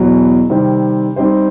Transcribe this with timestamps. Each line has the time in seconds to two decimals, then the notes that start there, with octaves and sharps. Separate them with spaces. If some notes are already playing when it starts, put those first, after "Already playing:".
Already playing: E2 B2 F#3
0.50 C3 D#3 G3 C4
1.16 G3 C4 D#4 G4 C5